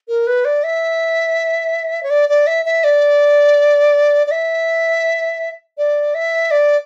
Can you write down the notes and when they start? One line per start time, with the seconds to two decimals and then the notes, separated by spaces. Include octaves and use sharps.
0.08 A#4
0.27 B4
0.45 D5
0.64 E5
2.03 C#5
2.10 D5
2.29 D5
2.47 E5
2.65 E5
2.84 D5
4.27 D5
4.31 E5
5.78 D5
6.15 E5
6.51 D5